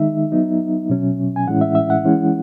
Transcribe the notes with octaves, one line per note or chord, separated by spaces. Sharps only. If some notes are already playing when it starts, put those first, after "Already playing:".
Already playing: D#3 G#3 D#4 E5
F#3 B3 D#4
B2 F#3 C#4
G#5
A2 E3 G#3 C#4 E4 F#5
E5
E5
F#5
E3 G#3 C#4 E4